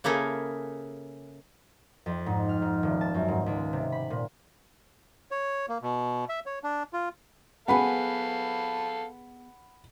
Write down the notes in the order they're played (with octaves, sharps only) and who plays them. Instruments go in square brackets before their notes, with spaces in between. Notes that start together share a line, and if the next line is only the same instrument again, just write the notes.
[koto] C#3 A#3 E4 G#4 A4
[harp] F2
G#2
F6
G#2
D#1
A5
F#2
G#2
C#2
C3
B5
A#2
[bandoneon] C#5
A#3
B2
E5
C#5
D4
F4
[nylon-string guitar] B3 G#4 [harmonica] A4 F5 [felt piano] F#5 B5